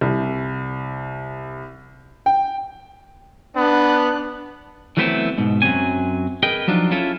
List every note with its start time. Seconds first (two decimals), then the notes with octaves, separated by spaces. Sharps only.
0.01 C2
2.26 G5
3.56 B3 D4 F#6
4.97 E3 F#3 A3 B3 C4 E4
5.38 G#2 B2
5.62 F#2 F#3 G#3 C4 D4 G#5
6.43 G#4 A#4 B4 D#5 G5
6.67 F3 F#3 D4 D#4 F4
6.91 C#4 E4 F4 A4